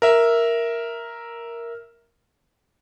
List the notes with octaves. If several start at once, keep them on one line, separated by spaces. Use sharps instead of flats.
A#4 E5